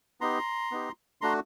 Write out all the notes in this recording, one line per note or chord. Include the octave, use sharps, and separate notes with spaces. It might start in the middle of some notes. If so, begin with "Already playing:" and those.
B3 D#4 G4 A#5 C6
B3 D#4 G4
A3 D4 F#4 A#5 C6